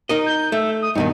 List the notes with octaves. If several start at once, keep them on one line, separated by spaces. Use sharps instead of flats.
D#4 A#4 D#5
G6
A3 E5
D#6
G2 B2 D#3 D#4